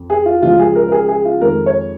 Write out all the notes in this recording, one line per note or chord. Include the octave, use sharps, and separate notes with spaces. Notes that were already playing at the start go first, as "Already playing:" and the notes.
Already playing: F2
G#4
F4
C#2 C#3 F3 G#3 F4
G#4
A#4
A#4
G#4
G#4
F4
F2 D#3 G#3 A#4
C#5